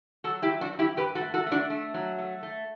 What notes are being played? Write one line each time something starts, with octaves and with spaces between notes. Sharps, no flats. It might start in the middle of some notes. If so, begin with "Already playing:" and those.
F#3 F#4 A4
E4 G4
F#3
D4 F#4
G2
E4 G4
G2 G4 B4
F#4 A4
A3
F#4 A4
A3
D4 F#4
A3
F#3
A3
A3